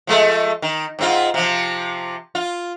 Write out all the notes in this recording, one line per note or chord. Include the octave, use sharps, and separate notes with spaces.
F3 G#3 A3
D#3
G#2 C4 F4
C3 F3
F4